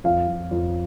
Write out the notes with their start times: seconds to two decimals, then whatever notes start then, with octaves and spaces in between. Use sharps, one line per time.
0.04 F2 F5
0.28 F2
0.51 F2